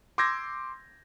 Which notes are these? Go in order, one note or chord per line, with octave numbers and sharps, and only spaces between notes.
C6 D6 E6 G6 G#6 A#6